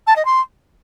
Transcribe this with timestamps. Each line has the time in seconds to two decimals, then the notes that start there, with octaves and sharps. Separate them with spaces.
0.07 A5
0.16 D#5
0.25 C6